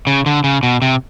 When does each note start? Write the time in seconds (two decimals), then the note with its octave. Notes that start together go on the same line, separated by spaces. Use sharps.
0.07 C#3
0.26 D3
0.44 C#3
0.63 B2
0.82 C3